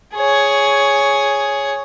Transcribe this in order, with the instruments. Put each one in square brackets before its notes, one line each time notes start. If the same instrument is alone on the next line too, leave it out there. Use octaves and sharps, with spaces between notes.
[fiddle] G#4 C#5